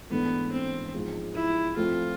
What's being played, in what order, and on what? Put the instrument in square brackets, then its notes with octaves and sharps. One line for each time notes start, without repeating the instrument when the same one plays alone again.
[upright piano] G#2 E3 A3 D4 A4 [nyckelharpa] B3
[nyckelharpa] C4
[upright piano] G#2 F3 G#3
[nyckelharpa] E4
[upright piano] F3 A3 C4 [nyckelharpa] F4